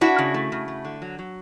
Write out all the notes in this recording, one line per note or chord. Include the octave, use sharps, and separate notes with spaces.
D4 E4 F#4
C#3
A3
C#3
A3
D3
F#3
F#3